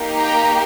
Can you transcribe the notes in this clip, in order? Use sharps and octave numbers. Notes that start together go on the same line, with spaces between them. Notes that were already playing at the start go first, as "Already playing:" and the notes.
Already playing: A#3 D#4 G4
G5 A#5